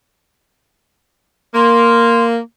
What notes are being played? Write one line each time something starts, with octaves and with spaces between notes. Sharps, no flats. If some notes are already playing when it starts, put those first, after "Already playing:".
A#3 C6